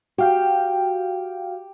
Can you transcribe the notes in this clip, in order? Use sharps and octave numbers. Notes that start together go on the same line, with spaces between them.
F#4 G4 F5 G5